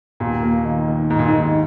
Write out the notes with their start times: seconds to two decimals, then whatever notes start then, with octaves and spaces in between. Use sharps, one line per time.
0.20 D#2 A#2
0.43 A#3
0.65 D#3
0.88 D#3
1.10 G#2 D#3
1.19 A#2
1.28 G#2 D#3